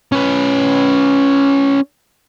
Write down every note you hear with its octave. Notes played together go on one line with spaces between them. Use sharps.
C#4 B4